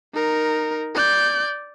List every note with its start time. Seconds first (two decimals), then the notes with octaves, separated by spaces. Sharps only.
0.13 D#4 A#4
0.94 D5 G6